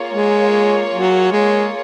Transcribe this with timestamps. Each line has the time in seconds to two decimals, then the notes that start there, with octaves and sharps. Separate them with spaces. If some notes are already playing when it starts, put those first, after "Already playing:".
Already playing: A#3 F4 G#4 C#5
0.12 G#3
0.92 F#3
1.32 G#3